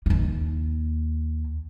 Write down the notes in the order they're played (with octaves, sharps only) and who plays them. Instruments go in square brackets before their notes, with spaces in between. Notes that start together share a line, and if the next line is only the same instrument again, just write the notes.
[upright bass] D#2 A#3